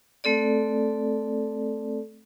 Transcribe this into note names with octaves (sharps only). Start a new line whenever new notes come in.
A3 C4 A4 D5